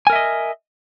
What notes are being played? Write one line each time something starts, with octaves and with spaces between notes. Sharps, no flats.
A#4 D#5 E5 G#5